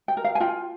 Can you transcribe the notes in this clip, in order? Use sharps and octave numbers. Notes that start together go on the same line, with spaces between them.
G5
A#4
F5
G#5
F4 G5